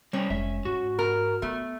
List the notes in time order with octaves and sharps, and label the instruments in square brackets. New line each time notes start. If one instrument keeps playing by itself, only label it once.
[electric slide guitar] G3 C5 [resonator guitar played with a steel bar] C#4
[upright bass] F1 G#3 [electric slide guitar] E5
[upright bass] G#2 [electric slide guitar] F#4
[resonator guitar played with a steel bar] A#4
[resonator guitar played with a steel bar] A3 [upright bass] B3